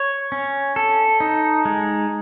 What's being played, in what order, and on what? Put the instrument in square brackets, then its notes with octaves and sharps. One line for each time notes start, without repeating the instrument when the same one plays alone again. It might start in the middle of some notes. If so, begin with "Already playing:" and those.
Already playing: [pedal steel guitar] C#5
C#4
A4
D#4
G#3